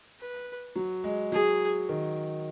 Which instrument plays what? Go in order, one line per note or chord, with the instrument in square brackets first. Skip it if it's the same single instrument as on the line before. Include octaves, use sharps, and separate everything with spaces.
[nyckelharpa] B4
[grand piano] F#3
G#3
[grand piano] F#3 [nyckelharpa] G#4
[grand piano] D#3